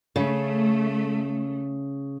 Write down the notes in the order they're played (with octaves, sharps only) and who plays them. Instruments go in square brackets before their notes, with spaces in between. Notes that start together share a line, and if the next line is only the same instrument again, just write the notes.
[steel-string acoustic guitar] C#3 [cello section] A3